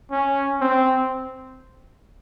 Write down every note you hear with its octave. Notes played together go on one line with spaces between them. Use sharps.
C#4
C4